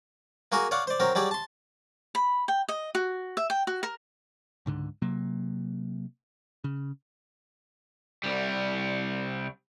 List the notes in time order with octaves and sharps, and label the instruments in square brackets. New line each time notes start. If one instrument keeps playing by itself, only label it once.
[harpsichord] A#3 F#4 G#4 A#4 G#5
C#5 D5 F5 F#5
C5 D5
F#3 C4 A#4
F#3 G3 G#4 D5
A5 C6
[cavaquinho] B5
G5
D#5
F#4
E5
G5
F#4
A#4
[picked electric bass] C#2 G#2 D3
C3 F#3 A#3
C#3
[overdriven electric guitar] C2 G3